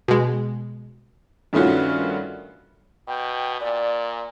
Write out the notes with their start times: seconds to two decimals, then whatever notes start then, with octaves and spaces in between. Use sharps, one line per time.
0.08 B2 G#3
1.53 G2 D#3 A3 C#4 F4 F#4
3.08 B2 G5
3.61 A#2 D5